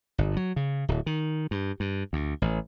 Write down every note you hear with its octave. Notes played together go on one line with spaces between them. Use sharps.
G1
F#3
C#3
D1
D#3
G2
G2
D2
A1